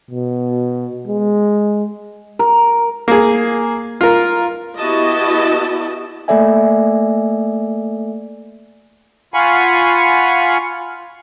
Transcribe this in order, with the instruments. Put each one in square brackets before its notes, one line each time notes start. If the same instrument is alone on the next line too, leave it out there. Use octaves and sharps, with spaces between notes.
[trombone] B2
G#3
[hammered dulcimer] A#4
[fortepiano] A#3 G#4
F4 A#4
[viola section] B3 E4 F#4 G4 D#5 A5
[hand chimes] A3 A#3 A4 D5 E5 G#5
[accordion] F4 F5 F#5 G#5 B5 C#6